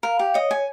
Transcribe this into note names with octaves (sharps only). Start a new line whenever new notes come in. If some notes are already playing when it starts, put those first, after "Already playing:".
A#4 F5
G4
C#5 D#5
G#5